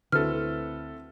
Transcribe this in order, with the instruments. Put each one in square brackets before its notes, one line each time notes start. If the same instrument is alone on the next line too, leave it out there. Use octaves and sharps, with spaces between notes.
[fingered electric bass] D2 D3 [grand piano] C4 E4 F#4 [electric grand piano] A4 B4 [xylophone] F6